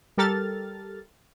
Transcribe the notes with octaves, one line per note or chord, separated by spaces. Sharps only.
G3 G4 A4 A#4 F6 A6